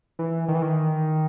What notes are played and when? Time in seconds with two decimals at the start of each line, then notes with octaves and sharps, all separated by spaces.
0.19 E3
0.48 D#3
0.55 E3
0.62 D#3